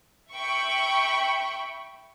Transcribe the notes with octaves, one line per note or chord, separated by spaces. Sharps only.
E5 G5 B5 C#6